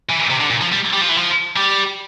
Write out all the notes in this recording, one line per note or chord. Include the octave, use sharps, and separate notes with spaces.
E3
C3
D3
A#2
F3
G3
G3
F3
E3
F3
G3